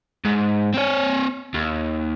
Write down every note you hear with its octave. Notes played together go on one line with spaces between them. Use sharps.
G#2
C4 C#5
D#2